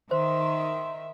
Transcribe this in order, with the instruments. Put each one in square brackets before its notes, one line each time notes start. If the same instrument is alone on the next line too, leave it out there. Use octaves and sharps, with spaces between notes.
[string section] D#3 [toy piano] C5 [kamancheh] E5 [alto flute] C6